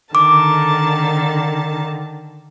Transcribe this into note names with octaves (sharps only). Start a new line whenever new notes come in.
D3 D#3 A5 D6